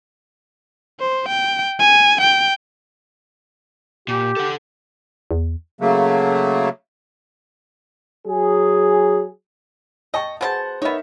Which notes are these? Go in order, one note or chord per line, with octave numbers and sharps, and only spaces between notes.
C5
G5
G#5
G5
A#2 G4
A4 F#5
E2
C#3 F#3 A3 A#3
F#3 G#4
D#5 G5 A5 C#6
B2 C4 G#4 C5 F#5 A5
B3 D#4 A#4 C#5 E5